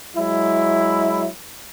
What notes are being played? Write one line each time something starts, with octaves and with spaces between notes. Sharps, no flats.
F#3 G#3 E4